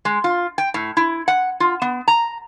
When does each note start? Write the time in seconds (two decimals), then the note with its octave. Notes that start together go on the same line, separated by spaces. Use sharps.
0.05 G#3
0.24 F4
0.58 G5
0.74 A2
0.97 E4
1.28 F#5
1.60 F4
1.82 B3
2.08 A#5